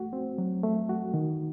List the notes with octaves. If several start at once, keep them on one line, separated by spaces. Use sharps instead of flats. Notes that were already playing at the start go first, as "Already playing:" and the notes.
Already playing: A3 F#4
C4
F#3
A3
F#4
D#3